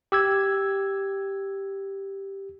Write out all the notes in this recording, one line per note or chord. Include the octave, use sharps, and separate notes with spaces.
G4 E6 G#6